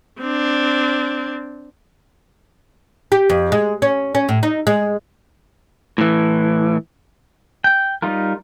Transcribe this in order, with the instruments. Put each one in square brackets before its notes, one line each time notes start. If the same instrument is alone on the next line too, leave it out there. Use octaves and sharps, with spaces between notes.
[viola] C4 D4
[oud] G4
F2
G#3
C#4
C#4
A2
D#4
G#3
[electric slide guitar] A2 E3
[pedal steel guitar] G5
G3 D#4 F4 A#4